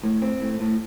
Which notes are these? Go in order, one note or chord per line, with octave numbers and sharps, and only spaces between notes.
A2
C4
A2
A2